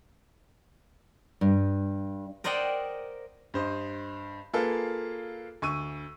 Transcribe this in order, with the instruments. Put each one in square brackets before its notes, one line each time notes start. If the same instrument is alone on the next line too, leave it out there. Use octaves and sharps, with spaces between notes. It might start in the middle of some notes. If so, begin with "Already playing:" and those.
[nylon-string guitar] G2
[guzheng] A#4 C5 D5 D#5 F#5 G5
[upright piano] G2 C5 D#5
A#3 F4 G#4 A4 B4 F5
D2 C#6 E6 D#7